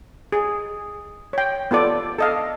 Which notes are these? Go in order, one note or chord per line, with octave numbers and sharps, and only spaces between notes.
G#4
C#5 G5
B3 F4 A4 D5
A4 D#5 F5